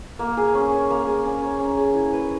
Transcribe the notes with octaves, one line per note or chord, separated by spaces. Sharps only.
A#3
G#4
C#4
C#5
A#3
G#4
C#4
C#5
C#4
G#4
E4
B4